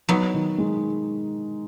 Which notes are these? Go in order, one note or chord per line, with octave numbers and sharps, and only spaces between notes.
F#3 B3 D#4
D#3
G#3